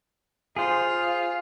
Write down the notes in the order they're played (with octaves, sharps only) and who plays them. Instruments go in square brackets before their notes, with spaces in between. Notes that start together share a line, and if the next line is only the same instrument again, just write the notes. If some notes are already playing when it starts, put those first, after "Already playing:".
[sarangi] F4 [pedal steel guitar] G#4 C5